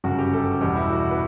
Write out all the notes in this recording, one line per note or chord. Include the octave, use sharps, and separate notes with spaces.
G1 F#2 C#3 F#4
G4
A4
E2 B2 G3 G4
E4
F#4
B4